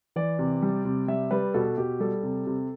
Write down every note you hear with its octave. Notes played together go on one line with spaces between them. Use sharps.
E3 D5
C3
G3
C3
G3 E5
G3 B4
B2 A4
B2 G4
G3 A4
C3
C3